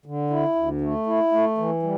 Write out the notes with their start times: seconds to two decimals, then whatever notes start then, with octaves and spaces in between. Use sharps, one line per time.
0.06 D3
0.30 E4
0.55 D2
0.81 A3
1.06 E4
1.32 A3
1.58 E3
1.82 G3